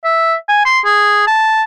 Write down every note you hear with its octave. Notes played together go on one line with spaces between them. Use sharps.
E5
G#5
C6
G#4
A5